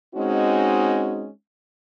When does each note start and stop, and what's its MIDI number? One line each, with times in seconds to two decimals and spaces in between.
0.15 1.28 56
0.15 1.28 60
0.15 1.28 61
0.15 1.28 63
0.15 1.28 66